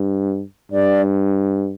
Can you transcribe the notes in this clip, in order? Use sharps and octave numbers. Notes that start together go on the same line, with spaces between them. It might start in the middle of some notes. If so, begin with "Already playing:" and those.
Already playing: G2
G2 D5